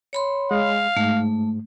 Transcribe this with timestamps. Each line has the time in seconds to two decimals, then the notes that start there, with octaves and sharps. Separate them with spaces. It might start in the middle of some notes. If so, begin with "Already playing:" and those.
0.13 C#5 B5 C6
0.51 G#3 F5
0.96 G#2 A3